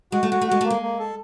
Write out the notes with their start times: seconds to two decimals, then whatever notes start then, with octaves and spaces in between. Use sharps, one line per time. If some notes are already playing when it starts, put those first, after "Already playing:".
0.12 G#3 F#4
0.23 A3
0.30 G#3 F#4
0.41 A3
0.48 G#3 F#4
0.61 A3 A#3
0.70 G#3
0.82 A#3
0.99 A4